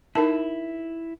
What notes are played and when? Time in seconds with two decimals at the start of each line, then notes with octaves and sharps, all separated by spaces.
0.15 D#4 E4 A#4 A5